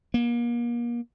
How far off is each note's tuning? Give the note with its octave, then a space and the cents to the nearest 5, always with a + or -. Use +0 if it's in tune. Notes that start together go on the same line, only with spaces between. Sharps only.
A#3 +35